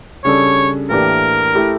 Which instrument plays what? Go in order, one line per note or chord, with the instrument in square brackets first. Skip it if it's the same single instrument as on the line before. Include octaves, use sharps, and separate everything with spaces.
[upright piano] C#3 G3 D4 A4 [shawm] C#5
[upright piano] A2 E3 A#3 D4 G4 [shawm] A#4
[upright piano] A3 E4 G4